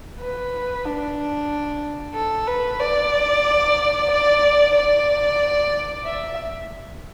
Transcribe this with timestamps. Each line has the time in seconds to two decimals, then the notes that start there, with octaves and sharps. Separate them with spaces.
0.20 B4
0.85 D4
2.14 A4
2.47 B4
2.80 D5
4.11 D5
4.75 D5
6.05 E5